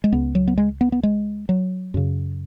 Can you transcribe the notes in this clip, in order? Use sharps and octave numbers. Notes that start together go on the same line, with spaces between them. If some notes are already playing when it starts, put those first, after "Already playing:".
G#3
C#2 C#3 B3
F#3
B3
G#3
B3
B3
G#3
F#3
F#2 C#3